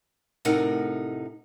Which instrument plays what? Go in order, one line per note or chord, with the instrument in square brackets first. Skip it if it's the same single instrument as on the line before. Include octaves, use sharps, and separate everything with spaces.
[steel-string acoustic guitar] D2 A2 C3 D#4 A#4 F#5